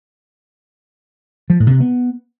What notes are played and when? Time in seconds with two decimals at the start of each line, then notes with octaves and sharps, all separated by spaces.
1.50 F3
1.60 A2
1.70 C3
1.80 B3